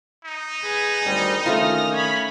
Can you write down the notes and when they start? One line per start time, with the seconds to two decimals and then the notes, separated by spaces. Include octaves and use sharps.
0.24 D#4
0.62 G#4 B4
1.05 G#1 D2 G3 D#5
1.46 D#3 A3 C#4 F4 D#6 F6
1.93 C#5 B5